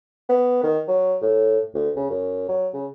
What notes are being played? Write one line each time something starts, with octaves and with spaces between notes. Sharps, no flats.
B3
D#3
F#3
A2
D2
C#3
F#2
F#3
C#3